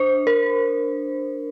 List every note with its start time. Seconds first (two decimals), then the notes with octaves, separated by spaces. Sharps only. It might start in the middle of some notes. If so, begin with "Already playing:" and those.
Already playing: D4 C5
0.27 A#4